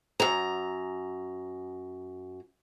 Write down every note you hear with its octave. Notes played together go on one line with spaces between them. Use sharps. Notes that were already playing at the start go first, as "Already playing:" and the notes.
F#2 A#5